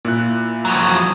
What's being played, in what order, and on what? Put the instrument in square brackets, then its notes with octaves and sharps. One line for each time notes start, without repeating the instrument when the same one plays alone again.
[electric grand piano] A#2 E4 F#6
[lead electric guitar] F2 F#3